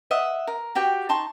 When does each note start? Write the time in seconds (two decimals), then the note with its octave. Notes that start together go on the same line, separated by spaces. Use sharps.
0.11 D#5 E5 F#5
0.47 A#4
0.75 F#4 G4 G5
1.09 D#4 A5 C6 C#6